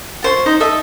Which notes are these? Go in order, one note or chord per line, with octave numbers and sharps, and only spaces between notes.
F4 C5 C#5
D#4 C5 D#5
A4 D#5 E5